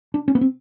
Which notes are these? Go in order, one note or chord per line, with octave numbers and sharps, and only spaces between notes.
D4
C#4
B3
C4